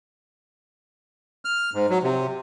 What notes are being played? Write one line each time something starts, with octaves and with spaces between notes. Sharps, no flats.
F6
G#2
F#3
C3